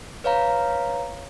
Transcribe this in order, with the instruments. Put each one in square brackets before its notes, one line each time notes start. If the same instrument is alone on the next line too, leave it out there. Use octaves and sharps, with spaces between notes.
[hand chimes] B4 C#5 F5 A#5